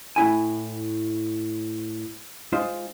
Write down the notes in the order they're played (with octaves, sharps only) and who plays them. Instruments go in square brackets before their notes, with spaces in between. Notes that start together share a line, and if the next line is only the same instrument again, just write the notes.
[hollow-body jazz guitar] A2 E4 G#5
G#3 D#4 F4 C5